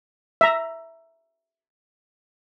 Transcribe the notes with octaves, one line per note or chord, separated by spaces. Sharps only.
E5 A#5